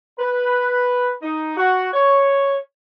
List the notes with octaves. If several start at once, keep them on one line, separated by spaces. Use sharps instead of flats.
B4
D#4
F#4
C#5